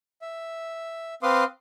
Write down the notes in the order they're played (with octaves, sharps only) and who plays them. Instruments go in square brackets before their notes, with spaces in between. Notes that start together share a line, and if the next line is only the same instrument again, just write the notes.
[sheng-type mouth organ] E5
C4 B4 F5 C6 D6 D#6